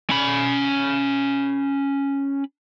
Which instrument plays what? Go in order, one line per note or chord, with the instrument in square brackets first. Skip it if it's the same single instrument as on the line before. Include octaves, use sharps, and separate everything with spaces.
[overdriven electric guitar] C#4 B5